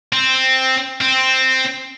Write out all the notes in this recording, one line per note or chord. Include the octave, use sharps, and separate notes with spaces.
C4
C4